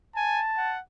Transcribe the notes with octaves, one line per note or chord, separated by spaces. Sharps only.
G#5 A5
F#5